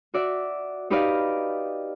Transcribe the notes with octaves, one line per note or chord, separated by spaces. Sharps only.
F#4 D5 E5
D#4 G4 B4 D5 D#5 F5